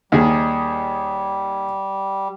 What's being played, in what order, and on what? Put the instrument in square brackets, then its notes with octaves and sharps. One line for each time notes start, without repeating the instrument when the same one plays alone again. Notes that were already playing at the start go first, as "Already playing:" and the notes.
[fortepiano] D#2 D#3 G#4 [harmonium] G3